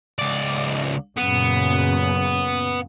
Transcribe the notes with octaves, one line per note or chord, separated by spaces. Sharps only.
C#2 D5
F#2 A#2 C#3 B3